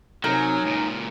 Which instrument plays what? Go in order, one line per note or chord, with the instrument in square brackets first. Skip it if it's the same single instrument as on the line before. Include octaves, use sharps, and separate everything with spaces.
[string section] C3 C#5 G#5 [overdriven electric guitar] F#3 [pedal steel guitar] D#4 [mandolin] A#4
[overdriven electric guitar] C#2 A#2 [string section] C#3